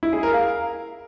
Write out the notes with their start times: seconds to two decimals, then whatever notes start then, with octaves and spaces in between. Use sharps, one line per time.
0.03 E4
0.13 G#4
0.23 A#4
0.33 F5